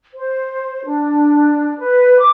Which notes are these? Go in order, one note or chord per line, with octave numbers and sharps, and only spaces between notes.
C5
D4
B4
D6